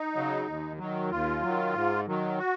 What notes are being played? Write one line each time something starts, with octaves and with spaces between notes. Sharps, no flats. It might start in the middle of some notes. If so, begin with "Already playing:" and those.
Already playing: D#4
C#3 F#3
D#2
D#3 F#3
D#2 F4
D#3 F#3
G#2
D#3 F#3
F#4